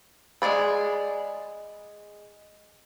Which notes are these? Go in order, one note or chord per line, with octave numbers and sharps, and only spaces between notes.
G#3 G#4 D5 B5